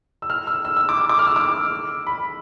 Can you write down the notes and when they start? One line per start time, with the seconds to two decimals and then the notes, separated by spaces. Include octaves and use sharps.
0.22 E6
0.30 F6
0.47 E6
0.65 E6
0.77 E6
0.89 D6
1.09 D6
1.19 F6
1.27 E6
1.36 D6
2.07 B5